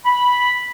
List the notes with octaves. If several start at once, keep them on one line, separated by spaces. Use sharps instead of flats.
B5